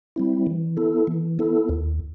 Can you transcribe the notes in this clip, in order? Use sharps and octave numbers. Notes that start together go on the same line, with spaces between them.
G3 C4 E4
E3
B3 E4 A4
E3
B3 E4 A4
D#2